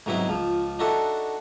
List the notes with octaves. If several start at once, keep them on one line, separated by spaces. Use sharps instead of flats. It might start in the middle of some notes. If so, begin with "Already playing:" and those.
G#2 C3 F#3 B3 D#4 E4
C#2 F3
D4 D#4 F#4 A4 E5